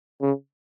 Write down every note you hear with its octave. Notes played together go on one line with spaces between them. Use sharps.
C#3